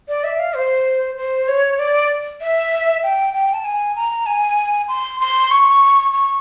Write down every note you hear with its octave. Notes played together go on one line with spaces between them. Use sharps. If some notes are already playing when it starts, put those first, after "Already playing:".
D5
E5
F5
C5
C5
C#5
D5
E5
G5
G5
A5
G#5
A#5
G#5
C6
C6
C#6
C#6